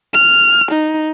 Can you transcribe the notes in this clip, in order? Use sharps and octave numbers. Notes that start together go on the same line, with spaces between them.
F6
D#4